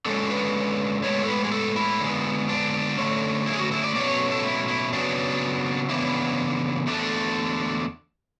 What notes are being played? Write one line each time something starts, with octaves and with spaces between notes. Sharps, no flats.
D3 G#3 C#4 A4
B4
A2 G#3 B3 C#5
A4
B4
G#4
A4
E4
D3 G#3 B3
D4
D3 A3 C#4
E4
G#4
F#4
E4
D5
B2 F#3 A3 C#4 D5
C#5
A4
E4
E4
C#3 F#3 B3 D4
C#3 E3 B3 D4 E4
E2 D3 A3 D4